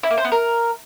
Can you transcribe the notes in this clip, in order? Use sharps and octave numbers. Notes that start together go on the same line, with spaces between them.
E4
A#3
C5
B3
A#4